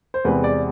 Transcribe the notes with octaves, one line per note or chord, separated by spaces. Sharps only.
C5
E2 C3 G#3 C4 B4
D5